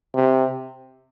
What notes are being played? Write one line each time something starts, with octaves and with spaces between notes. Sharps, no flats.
C3